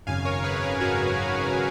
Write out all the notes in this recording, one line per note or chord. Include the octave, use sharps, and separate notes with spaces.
G#1 F#2 C#3 F5 G#5
A#4 C#5
G#4 B4
A#4 C#5
G#4
G#1 F#2 C#3 F#4 A#4